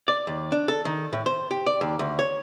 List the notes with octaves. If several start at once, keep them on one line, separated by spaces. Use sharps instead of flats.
D5
D#2
D4
A4
D#3
A2
C5
G4
D5
D#2
D2
C#5